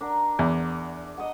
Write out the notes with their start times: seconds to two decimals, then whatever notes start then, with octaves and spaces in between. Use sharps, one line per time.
0.01 D4 A#4 F#5
0.39 E2
1.18 D#5 F#5